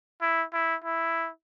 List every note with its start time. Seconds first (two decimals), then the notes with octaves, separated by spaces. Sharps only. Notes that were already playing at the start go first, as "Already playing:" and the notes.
0.21 E4
0.53 E4
0.84 E4